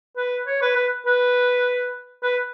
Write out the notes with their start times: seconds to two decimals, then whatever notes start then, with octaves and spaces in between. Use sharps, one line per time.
0.17 B4
0.47 C#5
0.62 B4
0.76 B4
1.06 B4
2.23 B4